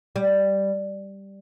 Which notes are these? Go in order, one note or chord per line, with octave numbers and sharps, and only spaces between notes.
G3